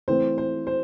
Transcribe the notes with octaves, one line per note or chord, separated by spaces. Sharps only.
E3 A3 C4 C5
C5
C5